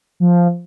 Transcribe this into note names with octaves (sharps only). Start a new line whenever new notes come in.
F3